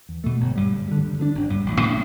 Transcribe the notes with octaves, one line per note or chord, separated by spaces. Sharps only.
E2
B2 A3
G1
G2 G3
D2
D3 G3
D2
D3 B3 D4
G1
G2 G3
A1
A2 G3 D4